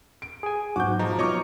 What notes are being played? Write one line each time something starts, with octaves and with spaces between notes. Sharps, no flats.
D7
G#4 G#5
B1 G#2 F#4 D6 G6
F3 D#4 A#5
B2 C#5 D#5 A#5 C#6 D6 F6